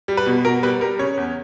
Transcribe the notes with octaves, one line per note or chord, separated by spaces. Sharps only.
G3
B4
B2
B2 A#4
G3 B4
G3 A#4
C#3 C#5
E2